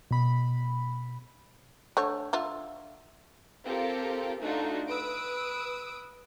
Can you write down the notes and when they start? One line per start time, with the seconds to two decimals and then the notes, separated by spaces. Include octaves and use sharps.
0.11 B2 B5
1.97 D3 A3 C#5
2.33 D3 F4 E5
3.65 C4 F4 G4 A4 A#4
4.41 A3 D4 D#4 F4 F#4
4.88 B4 D#6 E6 D7